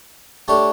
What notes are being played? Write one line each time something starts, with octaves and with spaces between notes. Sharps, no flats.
A3 D4 G4 C#5